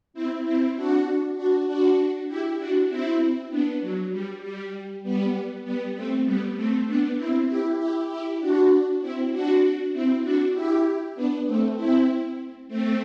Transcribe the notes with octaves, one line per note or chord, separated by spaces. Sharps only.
C4 E4
C4 E4
D4 F#4
D4 F#4
D4 F#4
E4 G4
D4 F#4
C4 E4
B3 D4
F#3
G3
G3
G3 B3
G3 B3
A3 C4
G3 B3
A3 C4
B3 D4
C4 E4
E4 G4
E4 G4
E4 G4
D4 F#4
C4 E4
D4 F#4
C4 E4
D4 F#4
E4 G4
B3 D4
A3 C4
C4 E4
A3 C4